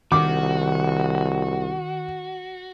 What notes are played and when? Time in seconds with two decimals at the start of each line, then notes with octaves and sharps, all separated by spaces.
0.12 C2 D#3 F#4 D6